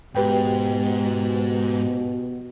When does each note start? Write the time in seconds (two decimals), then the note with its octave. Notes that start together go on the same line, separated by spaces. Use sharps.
0.15 G#2 B2 G4 B4 G5